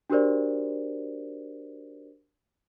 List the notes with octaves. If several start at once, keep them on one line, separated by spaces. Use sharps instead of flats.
D4 F#4 G4 A#4 C5 D5